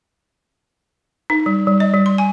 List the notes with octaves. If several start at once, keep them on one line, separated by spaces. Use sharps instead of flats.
D#4
G3
G3
D#5
G3
C6
G#5